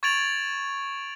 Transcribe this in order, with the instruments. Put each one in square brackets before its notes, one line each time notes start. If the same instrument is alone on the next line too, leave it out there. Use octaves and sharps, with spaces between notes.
[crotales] C#6 G#6 A6 D7 F7 F#7